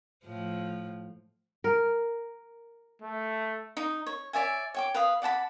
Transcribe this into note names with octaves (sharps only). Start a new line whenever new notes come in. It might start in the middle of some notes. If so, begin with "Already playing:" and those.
A2 F3
A#4
A3
D#4
C#5
C#5 D5 E5 G#5
C#5 G5 D6
B4 F5 D#6
D5 F#5 A5 B5